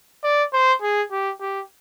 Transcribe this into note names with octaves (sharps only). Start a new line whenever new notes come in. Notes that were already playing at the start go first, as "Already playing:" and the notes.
D5
C5
G#4
G4
G4